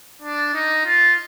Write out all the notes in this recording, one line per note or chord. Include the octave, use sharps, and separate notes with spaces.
D4
D#4
F4